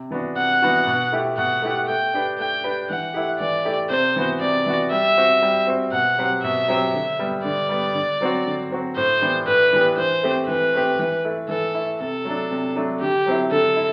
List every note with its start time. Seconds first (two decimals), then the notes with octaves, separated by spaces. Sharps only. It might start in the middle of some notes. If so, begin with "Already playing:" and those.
Already playing: C3
0.11 E3 B3 D4 F#4
0.36 C3 F#5
0.62 E3 B3 D4 F#4
0.87 B2
1.12 A3 E4 G4
1.38 B2 F#5
1.62 A3 E4 G4
1.88 A3 G5
2.14 D4 G4 B4
2.39 A3 G5
2.64 D4 G4 B4
2.90 E3 F#5
3.14 A3 E4 G4
3.40 E3 D5
3.65 A3 E4 G4
3.90 C3 C5
4.16 E3 B3 F#4
4.40 C3 D5
4.66 E3 B3 F#4
4.91 G3 E5
5.18 C4 F#4 C5
5.42 G3
5.67 C4 F#4 C5
5.92 B2 F#5
6.18 F#3 C4 G4 C5
6.43 B2 E5
6.68 F#3 C4 G4 C5
6.94 D3
7.19 G3 B3
7.44 D3 D5
7.69 G3 B3
7.95 D3
8.21 F#3 C4 F#4
8.46 D3
8.71 F#3 C4 F#4
8.96 A2 C5
9.22 E3 B3 D4 G4
9.46 A2 B4
9.73 E3 B3 D4 G4
9.97 E3 C5
10.23 A3 C4 G4
10.48 E3 B4
10.74 A3 C4 G4
10.99 E3
11.25 A3 E4
11.49 E3 A4
11.75 A3 E4
12.00 C3 A4
12.25 F#3 A3 D4
12.51 C3
12.76 F#3 A3 D4
13.01 D3 G4
13.26 F#3 C4 E4
13.51 D3 A4
13.77 E4